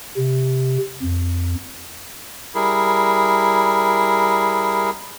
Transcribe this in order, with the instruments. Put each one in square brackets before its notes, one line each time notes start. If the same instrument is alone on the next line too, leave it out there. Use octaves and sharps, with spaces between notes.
[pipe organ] C3
F2
[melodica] G3 E4 G#4 A#4